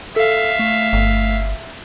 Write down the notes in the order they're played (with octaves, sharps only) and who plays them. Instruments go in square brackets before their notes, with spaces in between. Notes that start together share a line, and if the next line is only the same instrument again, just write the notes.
[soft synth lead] A4 [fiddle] E5 F5
[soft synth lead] A3
[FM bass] G1